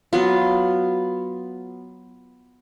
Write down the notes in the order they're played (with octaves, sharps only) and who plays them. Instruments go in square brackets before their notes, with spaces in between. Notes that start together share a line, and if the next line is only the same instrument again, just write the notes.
[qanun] F#3 B3 F4